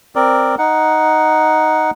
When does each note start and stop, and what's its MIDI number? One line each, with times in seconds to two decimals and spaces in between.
0.16 0.55 60
0.16 0.55 70
0.16 0.55 74
0.58 1.91 63
0.58 1.91 78